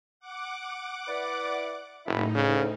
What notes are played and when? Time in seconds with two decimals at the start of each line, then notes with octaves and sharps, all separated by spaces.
0.20 F#5 D6
1.08 E4 B4 D5
2.06 F#1 A2 D#4 E4 B5
2.35 D2 C#3